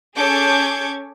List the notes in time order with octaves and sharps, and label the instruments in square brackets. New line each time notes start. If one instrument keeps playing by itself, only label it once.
[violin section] C#4 G#4 A4 D6 G6 G#6